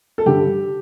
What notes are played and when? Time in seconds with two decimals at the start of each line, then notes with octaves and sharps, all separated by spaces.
0.18 A4
0.26 G2 D3 G4